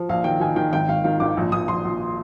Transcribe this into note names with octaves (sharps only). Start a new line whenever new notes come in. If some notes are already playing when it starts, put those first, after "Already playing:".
Already playing: F3
A#1 F5
D#3 G5
D#3 G#5
D#3 G5
G#1 G5
G#1 F5
D#3 F5
G#1 D6
A#1
A#1 D#6
A#1 C6
A#1